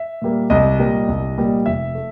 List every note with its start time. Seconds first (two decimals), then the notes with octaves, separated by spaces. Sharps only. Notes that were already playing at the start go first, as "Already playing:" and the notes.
Already playing: E5
0.22 A#2 G3 A#3
0.50 C2 D#5
0.79 A#2 G3 A#3
1.08 C2
1.38 A#2 G3 A#3
1.66 F1 E5
1.95 A3